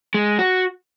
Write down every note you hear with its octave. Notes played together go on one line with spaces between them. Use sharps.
G#3
F#4